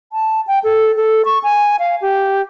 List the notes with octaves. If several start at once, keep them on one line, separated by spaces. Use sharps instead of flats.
A5
G5
A4
A4
C#6
G#5
F5
G4